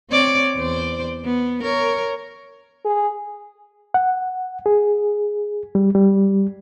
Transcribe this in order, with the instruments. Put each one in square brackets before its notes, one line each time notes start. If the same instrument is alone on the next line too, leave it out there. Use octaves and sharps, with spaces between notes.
[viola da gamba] C4 C#5 D5
E2 C5 D5
B3
A#4 C#5
[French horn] G#4
[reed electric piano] F#5
G#4
G3
G3